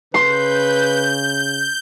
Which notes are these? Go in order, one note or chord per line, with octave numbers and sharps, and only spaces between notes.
C#3 B4 C6 G6